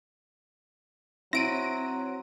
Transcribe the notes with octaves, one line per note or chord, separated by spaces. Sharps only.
F#3 C4 E4 A#6 D7 D#7